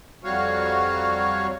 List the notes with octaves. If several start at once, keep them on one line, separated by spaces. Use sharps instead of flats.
F2 F#3 G3 F#4 C#5 F5